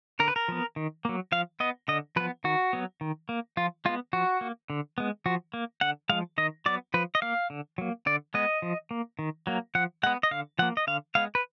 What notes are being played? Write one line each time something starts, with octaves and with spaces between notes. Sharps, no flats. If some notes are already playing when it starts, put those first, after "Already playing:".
D3 A#4
B4
A#4
F3 B3
D#3
F#3 A#3
F3 F5
B3 D#5
D3 D#5
F3 B3 B4
D#3 F#4
F#3 B3
D#3
A#3
F3 F4
G#3 B3 F4
F3 F#4
A#3
D3
G#3 B3
F3 F#4
A#3
D3 F#5
F3 G#3 F5
D#3 D#5
F#3 B3 D5
F3 B4
D#5
A#3 F5
D3
F#3 A#3
D3 D5
G#3 B3 D#5
F3
A#3
D#3
F#3 A#3
F3 F#5
G#3 B3 F#5
D#5
D3 F5
F3 A#3 F#5
D#5
D3 F5
G#3 B3 F5
B4